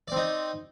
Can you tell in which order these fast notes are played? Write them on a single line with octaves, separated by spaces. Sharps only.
D5 C4 D#4